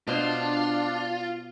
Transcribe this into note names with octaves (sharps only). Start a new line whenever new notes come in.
B2 D4 F4 C5